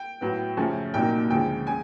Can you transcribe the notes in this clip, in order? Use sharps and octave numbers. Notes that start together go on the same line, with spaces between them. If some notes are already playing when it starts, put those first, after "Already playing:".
Already playing: G5
A2 F#3 B3
F#2 C#3 F3 A3 C#4
C2 A#2 F#3 A#3 D#4 G5
D2 C#3 F3 G#3 G5
C#3 G#5